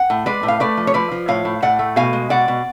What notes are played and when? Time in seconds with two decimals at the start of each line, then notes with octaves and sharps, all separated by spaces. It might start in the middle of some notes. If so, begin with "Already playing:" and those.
Already playing: F#5
0.10 A2
0.26 G#3 B4 D5
0.43 A2
0.48 F5
0.60 A3 B4 D5
0.77 F3
0.87 C#5
0.94 F3 B4 D5
1.12 F3
1.28 A2 C#5 F5
1.45 A2
1.62 A2 D5 F#5
1.79 A3
1.96 B2 F5 G#5
2.13 G#3
2.30 B2 D5 F#5
2.48 B2